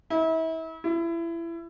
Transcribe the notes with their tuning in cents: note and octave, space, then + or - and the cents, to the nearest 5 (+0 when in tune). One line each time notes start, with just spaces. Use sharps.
E4 -35
E4 +25